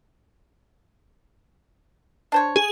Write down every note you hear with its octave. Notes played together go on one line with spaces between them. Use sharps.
D4 C5 C#5
G#4